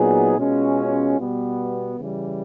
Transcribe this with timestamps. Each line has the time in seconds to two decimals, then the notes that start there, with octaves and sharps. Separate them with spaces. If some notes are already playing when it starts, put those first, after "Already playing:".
Already playing: A#2 F#3 B3 D#4 G#4
0.37 B2 G#3 C#4 F4
1.19 B2 G3 B3
1.99 C#3 E3 G3